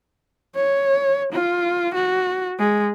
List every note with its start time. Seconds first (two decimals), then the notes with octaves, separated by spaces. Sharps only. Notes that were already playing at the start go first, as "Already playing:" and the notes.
0.56 C#5
1.33 F4
1.94 F#4
2.59 G#3